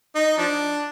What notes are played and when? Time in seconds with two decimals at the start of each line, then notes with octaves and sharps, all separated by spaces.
0.15 D#4
0.38 F3 D4